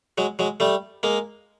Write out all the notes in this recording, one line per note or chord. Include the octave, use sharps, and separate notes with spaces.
F#3 G#3
F#3 G#3
G3 A3
G#3 A#3